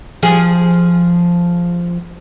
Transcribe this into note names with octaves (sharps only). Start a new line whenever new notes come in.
F3 G#4